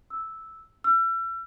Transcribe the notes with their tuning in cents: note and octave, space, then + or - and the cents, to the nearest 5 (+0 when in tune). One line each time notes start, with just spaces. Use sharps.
E6 -5
E6 +40